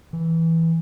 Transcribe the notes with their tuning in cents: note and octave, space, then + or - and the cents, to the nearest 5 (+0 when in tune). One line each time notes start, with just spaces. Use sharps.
E3 -5